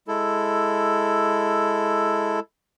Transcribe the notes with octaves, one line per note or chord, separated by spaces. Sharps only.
G#3 E4 A4